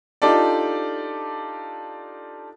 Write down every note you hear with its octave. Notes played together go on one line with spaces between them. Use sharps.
D4 D#4 F4 G4 A4 D5